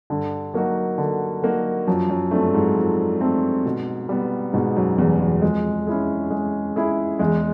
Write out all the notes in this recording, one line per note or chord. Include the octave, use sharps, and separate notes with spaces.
G2 D3
F#3 A#3 D#4 F#4
D3
F#3 A#3 D#4 F#4
F#2 F3
F#2
G2 A3 C4
G#2
F3
A3 C4
B2
G3 B3
G#2 B2
F#2
E2 G3 B3
E2
F2 G#3
C#4 E4 G#4
G#3
C#4 E4 G#4
E2 G#3